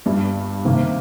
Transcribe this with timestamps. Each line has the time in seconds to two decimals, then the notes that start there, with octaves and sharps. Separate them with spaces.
0.06 G1 G2 G3
0.65 C3 D#3 A#3